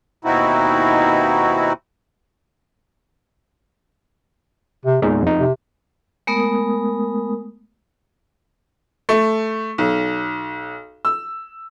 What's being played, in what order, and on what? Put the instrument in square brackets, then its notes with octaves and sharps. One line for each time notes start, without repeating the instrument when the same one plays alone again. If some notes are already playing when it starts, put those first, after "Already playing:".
[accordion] D#2 B2 C4 D#4 E4 F#4
[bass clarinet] C3
[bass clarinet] E2 [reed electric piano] A#2 G#3 D#4
[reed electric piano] F2 D#4
[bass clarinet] C3
[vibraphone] G#3 A3 B3 A#4 D#6
[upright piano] A3
B1
E6